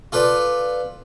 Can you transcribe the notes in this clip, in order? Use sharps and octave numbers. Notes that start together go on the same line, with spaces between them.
F4 A4 B4 D5